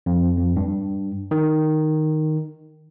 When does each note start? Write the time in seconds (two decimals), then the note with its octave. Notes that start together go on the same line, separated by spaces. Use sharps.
0.06 F2
0.38 F2
0.56 G2
1.31 D#3